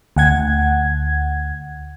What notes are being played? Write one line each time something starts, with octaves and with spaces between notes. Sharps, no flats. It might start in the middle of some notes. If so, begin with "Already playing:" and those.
D2 F#5 G#6